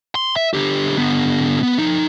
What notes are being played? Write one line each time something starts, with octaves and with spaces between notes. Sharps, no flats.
C6
E5
D3 G4
D3 B3
B3
F3 D#4